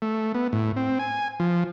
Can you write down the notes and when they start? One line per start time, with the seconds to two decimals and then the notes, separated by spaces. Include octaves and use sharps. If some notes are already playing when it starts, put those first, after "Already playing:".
0.02 A3
0.34 B3
0.53 A2
0.76 C4
0.99 G#5
1.40 F3